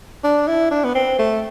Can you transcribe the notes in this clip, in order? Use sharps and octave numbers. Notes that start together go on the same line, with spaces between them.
D4
E4
D4
B3
C4
A3